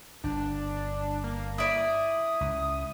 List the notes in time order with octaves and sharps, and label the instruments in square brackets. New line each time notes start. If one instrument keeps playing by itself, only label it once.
[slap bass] G1 [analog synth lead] D4
[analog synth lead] A#3
[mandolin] E4 D5 [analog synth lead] D#6
[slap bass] C#2